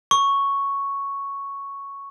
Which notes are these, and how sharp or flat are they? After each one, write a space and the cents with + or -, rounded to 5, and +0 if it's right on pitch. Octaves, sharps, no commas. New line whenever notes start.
C#6 +0